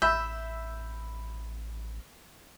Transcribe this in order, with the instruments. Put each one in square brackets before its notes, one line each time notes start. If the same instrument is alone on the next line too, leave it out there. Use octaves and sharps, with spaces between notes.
[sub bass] A1 [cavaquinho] E5 [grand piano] B5 E6 G6